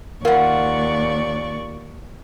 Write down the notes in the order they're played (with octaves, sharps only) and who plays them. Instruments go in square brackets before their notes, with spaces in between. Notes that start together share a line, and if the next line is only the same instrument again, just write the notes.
[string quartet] D#2 D5 C#6 [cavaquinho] F4 F#5 [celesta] A#4